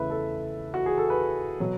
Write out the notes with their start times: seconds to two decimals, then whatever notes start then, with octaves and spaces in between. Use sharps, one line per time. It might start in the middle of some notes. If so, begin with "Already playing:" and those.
Already playing: E2 C#3 E3 A3 B4 E5
0.10 A4
0.74 F#4
0.86 G#4
0.98 A4
1.10 B4
1.60 B2 F#3